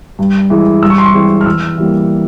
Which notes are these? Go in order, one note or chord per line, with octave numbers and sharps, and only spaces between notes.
G2
E3 G#3
G2 E6
C#6
C6
C#6
E3 G#3 C4
F6
E2 E6
E3 G3 A#3